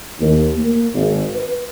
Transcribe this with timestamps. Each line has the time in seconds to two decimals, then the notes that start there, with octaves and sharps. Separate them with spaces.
0.20 D#2
0.57 A#3
0.95 G#1
1.34 B4